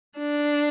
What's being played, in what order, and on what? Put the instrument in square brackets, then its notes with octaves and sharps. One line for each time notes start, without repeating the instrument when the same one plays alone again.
[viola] D4